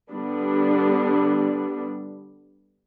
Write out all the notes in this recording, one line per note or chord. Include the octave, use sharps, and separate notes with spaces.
D3 G3 B3 D4